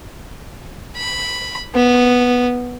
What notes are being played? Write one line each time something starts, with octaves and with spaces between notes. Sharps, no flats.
B5
B3